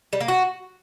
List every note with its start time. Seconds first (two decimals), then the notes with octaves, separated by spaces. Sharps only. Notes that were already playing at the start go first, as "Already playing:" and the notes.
0.13 G3
0.21 A#3
0.28 F#4